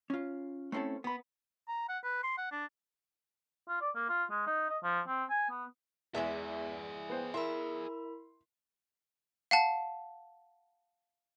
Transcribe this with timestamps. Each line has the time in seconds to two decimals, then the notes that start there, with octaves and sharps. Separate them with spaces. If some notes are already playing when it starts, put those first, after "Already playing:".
0.10 C#4 F4
0.72 A3 C4 C#4 E4 A4
1.04 B3 B5
1.68 A#5
1.89 F#5
2.04 B4
2.24 C6
2.38 F#5
2.52 D4
3.69 F4
3.81 D5
3.95 A#3
4.09 F4
4.31 G#3
4.47 D#4
4.69 D#5
4.83 F3
5.07 C4
5.30 G#5
5.50 B3
6.14 E2 G#3 E4 G#4 D5 E5
7.09 B3 C5 G5
7.34 E4 A#4 E5 B5 C6
9.51 F5 F#5 A5